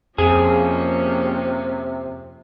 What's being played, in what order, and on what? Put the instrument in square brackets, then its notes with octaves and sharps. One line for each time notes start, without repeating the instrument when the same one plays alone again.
[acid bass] F2 [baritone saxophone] C3 [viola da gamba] F3 A#3 C#4 [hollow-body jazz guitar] G#4